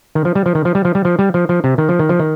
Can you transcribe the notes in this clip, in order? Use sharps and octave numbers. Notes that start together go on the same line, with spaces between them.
D#3
F3
G3
F3
D#3
F3
G3
F3
G3
F3
G3
F3
F3
C3
D#3
F3
D#3
F3
D#3